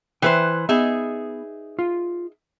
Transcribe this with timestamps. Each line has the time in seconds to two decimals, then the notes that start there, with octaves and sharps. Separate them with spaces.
0.22 E3 B4 C5 E5 G5
0.69 B3 D#4 G#4 E5
1.79 F4